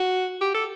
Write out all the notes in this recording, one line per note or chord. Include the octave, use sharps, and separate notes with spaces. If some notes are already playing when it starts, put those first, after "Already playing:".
Already playing: F#4
G4
A4